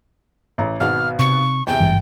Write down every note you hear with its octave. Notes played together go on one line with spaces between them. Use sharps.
A1 A#5
G#1 B2 F#5 F6
C3 C#6
E2 C3 G5
G#1 G2 E3